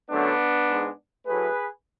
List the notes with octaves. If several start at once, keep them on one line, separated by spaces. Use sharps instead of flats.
F#2 D3 F#3 A3 B3 D4
G#2 G#3
A2 F#3 A3 G#4 B4